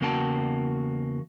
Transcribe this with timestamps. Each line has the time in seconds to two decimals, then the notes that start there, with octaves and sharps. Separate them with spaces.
0.01 E2 C#3 A#3 F#4 G5 A5